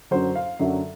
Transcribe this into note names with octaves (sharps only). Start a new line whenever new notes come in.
F#2 D3 F#3 C5
F5
F#2 D3 F#3 E5